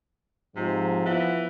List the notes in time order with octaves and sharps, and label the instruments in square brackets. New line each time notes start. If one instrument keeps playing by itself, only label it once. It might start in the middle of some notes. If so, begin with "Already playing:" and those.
[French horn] G#2 [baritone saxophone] C3 [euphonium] F3
[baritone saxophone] E3 [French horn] B3